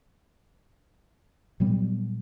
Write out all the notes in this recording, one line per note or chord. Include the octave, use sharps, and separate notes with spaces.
A#2 F#3 G3 B3